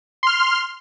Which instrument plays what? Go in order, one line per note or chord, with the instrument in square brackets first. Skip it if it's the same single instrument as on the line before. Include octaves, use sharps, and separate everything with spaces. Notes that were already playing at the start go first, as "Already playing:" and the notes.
[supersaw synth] C6 F6